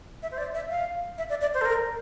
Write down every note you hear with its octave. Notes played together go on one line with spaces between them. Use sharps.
E5
C5
D5
E5
F5
E5
D5
D5
C5
A4
A#4